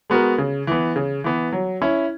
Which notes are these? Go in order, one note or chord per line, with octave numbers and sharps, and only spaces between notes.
G#3 B3 F#4 A#4
C#3
E3 B3
C#3
E3 B3
F#3
C#4 E4